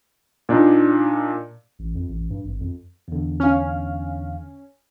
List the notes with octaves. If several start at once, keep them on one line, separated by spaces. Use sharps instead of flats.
A#2 D4 D#4
A1
F2
A1
G2
G#1
F2
E2 D3
C#4 F5 F6